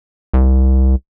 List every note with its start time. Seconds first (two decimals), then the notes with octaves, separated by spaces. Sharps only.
0.34 C2